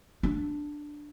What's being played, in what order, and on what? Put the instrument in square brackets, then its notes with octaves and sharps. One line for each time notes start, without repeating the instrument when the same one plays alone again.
[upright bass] D4